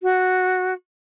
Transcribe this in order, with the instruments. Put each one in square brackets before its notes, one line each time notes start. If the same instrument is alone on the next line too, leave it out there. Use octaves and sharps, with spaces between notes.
[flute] F#4